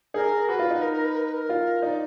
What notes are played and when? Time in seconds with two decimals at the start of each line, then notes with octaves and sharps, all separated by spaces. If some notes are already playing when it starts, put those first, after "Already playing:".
0.14 G#4 A#4
0.48 F#4 B4
0.59 F4
0.70 D#4
0.81 A#4
0.93 A#4
1.05 B4
1.16 A#4
1.24 B4
1.33 A#4
1.49 F4
1.82 D#4 D5